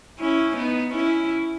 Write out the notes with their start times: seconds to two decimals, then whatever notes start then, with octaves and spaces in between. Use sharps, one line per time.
0.19 C#4 E4
0.57 B3 D#4
0.95 C#4 E4